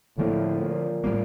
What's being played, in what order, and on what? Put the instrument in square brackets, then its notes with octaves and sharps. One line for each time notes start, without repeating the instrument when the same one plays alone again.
[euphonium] A2 [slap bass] D3 F3 A#3
[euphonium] A#2
[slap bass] A2 G3 A#3